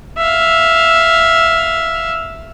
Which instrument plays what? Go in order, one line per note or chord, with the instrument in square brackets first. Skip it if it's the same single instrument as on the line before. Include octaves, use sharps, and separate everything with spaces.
[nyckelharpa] E5 F5